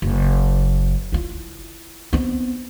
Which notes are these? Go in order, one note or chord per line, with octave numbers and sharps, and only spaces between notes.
F#1
E4 F4
B3 C4